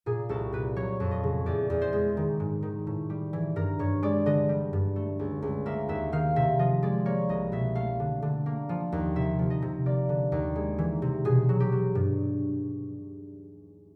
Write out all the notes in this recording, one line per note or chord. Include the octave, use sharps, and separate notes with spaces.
A#2 G#4
C2 A4
A#2 B4
F#3 C#5
F2
D#5
C#3
E2 D5
E2
C5
G#3
D#3
G#2
D#3
A2
G3
E3
G2 A#4
G2 C#5
G#3 D5
D3 D#5
G3
G2
A3
C#2
C#2
A#3 E5
D#2 E5
D#3 F5
C3 E5
F3 D#5
G#3 D5
A#3 C#5
C2 D#5
B2 E5
A3 F5
D3
D3
A#3
F3
D#2
C3 E5
F3
D#5
C3
A#3 D5
D3
D#2
G#3
E3
C3
B2 G#4
F#3
G4
F#3
G2